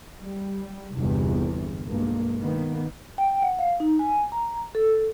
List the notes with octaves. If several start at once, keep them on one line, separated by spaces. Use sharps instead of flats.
G3
G1 E2 C3
B1 G2 G#3 A#3
D#3 A#3 B3
G5
F#5
F5
D#4
G#5
A#5
A4